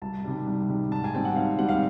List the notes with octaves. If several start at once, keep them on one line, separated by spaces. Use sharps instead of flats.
C2 A5
C3 D#3 G3
C2
C3 D#3 G3
G#2 A5
G#5
D#3 G3 C4 G5
F#5
G#2 F5
D#3 G3 C4 F#5
F5